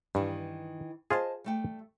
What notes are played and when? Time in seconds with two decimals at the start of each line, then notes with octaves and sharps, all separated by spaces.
0.15 G2 D#3 E3
1.10 F4 G#4 C5 D#5 A5
1.44 G3 A3 G5